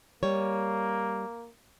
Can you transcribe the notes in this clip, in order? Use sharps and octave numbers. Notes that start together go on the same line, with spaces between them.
G3 A#3 C#5